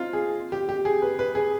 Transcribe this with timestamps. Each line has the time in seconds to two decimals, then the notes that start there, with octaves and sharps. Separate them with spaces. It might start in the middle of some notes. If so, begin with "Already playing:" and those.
Already playing: C4 D#4 F4
0.13 G#4
0.52 G4
0.69 G4
0.85 G#4
1.02 B4
1.19 B4
1.35 G#4